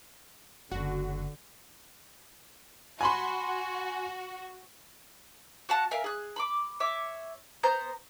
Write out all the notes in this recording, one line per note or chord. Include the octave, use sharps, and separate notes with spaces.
F#1 F#2 D3 F#4
F#4 G#5 B5 C6
F#4 F5 F#5 A5
A#4 E5 F5 G#5
G#4 F#6
B5 C6 D6
C#5 E5 D6
B3 C5 A#5 G6